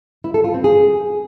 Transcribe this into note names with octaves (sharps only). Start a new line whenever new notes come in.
E4
A4
F4
C4
G#4